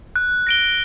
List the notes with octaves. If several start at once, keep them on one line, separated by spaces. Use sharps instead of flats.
F#6
A#6 D7 G7